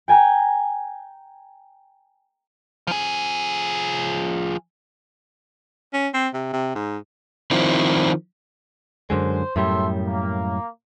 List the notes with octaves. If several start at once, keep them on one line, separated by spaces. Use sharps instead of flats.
G5 G#5 A#5 G6
F3 G#4
C#4
C4
C3
C3
G#2
D#3 F3 C4 E4
F#2 D3 G#3 C5
F#2 A2 G3 A4 E5 C6
A#3